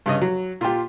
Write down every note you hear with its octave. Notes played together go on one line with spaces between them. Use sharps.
G2 C#3 D#5
F#3
A#2 F4 G4